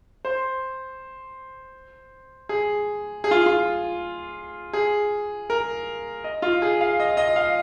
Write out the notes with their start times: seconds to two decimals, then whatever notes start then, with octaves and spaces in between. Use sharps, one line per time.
0.25 C5
2.49 G#4
3.24 G#4
3.31 F4
3.46 F4
4.73 G#4
5.50 A#4
6.24 D#5
6.42 F4
6.62 G#4
6.81 F5
7.00 D#5
7.17 D#5
7.36 F5